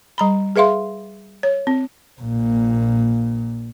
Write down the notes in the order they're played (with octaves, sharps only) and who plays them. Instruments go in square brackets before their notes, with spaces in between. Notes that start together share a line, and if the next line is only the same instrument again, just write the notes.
[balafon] G3 A#5 B5
G#4 B4 E5 F5 C6
C#5
C4
[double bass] A#1 A#2